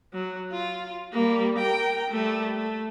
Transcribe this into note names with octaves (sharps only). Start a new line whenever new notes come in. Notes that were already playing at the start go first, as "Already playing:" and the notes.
F#3
F4
G3 A#3
A#4 G5
G3 A3
A3